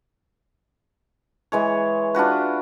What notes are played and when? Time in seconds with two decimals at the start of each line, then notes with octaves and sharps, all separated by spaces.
1.52 E3 G#3 C#5
2.15 D4 F4 F#4 B4